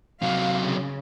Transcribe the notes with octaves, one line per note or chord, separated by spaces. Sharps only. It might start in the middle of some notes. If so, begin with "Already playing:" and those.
C3 F#3 F5
C#3